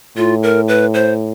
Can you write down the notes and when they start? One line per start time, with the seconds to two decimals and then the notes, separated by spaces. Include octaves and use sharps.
0.16 A2 F4
0.43 A#4
0.68 B4
0.94 C5